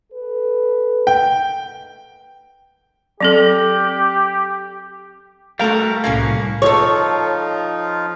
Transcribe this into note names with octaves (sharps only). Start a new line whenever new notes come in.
A4 B4
G5
F#3 C4 G4 A4
G3 A3 F#4 A4 A#4 F5
C2 A2 A#3 C#4 F#4 F5
F3 D#4 F4 A4 C#5